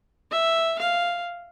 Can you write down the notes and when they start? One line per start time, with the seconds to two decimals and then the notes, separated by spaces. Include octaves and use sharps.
0.32 E5
0.79 F5